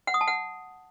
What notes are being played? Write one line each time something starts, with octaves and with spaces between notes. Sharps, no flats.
F#5
D#6
A5
F#5